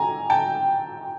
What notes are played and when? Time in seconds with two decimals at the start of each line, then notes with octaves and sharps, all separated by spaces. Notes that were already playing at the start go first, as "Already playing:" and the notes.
Already playing: G#5 A#5
0.30 G5 A5